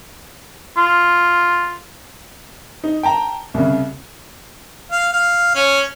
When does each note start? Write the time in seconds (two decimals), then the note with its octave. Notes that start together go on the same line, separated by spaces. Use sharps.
0.77 F4
2.84 D#4
3.03 G5 A5 A#5
3.54 C2 C#3
4.92 F5
5.13 F5
5.55 C#4